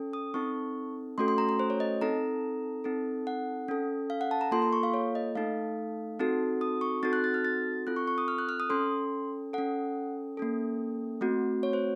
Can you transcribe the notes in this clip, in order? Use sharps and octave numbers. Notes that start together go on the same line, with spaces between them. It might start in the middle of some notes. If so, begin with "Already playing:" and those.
Already playing: C#4 A4
D#6
C4 D#4 A4 C#6
A3 C#4 F#4 A4 C6
C6
A#5
A#5
C5
C#5
D#5
C4 D#4 A4 A#5
C4 D#4 A4
F#5
C#4 A4
F5
F#5
A5
A#5
A#3 F4 A4 C6
C6
C#6
F5
C#5
D#5
A3 D#4 A4 F5
C4 D#4 F#4 A4
D#6
C#6
C4 D#4 F#4 A4 A6
F#6
A6
F6
A6
C4 F4 A4 F#6
C#6
C#6
D#6
F6
F#6
F6
D#6
C#4 A4 C6
C#4 A4 F#5
A#3 C#4 A4
A3 C4 F#4
C#5
C5